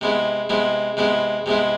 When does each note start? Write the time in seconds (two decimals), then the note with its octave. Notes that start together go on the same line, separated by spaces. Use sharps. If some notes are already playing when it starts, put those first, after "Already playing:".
0.01 C3 G#3 B3 E4
0.49 C3 G#3 B3 E4
0.97 C3 G#3 B3 E4
1.46 C3 G#3 B3 E4